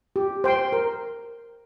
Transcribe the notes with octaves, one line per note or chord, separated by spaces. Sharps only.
G4
C5 G5 C6
A#4